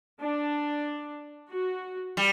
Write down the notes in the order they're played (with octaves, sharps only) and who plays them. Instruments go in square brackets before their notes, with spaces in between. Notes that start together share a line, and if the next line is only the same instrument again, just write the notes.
[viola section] D4
F#4
[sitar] G3